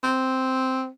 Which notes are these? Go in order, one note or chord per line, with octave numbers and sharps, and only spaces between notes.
C4